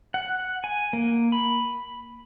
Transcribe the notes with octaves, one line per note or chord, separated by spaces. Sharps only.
F#5
G#5
A#3
B5